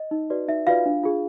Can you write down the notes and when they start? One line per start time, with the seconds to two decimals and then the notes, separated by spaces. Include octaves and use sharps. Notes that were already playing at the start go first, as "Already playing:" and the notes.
Already playing: D#5
0.11 D#4
0.30 F#4 B4 D5
0.48 D#4 E5
0.67 F4 F#4 B4 D5 F5
0.86 D4
1.03 F4 G#4